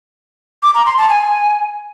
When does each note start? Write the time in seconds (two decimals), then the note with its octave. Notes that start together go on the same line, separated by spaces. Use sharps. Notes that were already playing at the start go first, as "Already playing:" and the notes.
0.63 D6
0.74 A#5
0.86 C6
0.98 A5
1.09 G#5